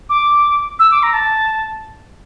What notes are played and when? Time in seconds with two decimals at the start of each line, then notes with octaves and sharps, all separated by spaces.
0.10 D6
0.79 E6
0.91 D6
1.03 A#5
1.13 A5